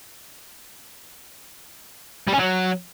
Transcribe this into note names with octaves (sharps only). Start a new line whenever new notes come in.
G3
C#4
F#3